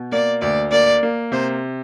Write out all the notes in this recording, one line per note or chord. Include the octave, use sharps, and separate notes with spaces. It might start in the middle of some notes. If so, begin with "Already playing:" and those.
Already playing: B2
A#3 D5
D2 D5
A#3 D5
A#3
C3 C5